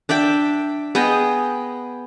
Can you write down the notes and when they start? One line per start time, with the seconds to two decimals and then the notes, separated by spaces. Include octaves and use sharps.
0.09 D4 D5 E5 G5
0.95 B3 G#4 D#5 G5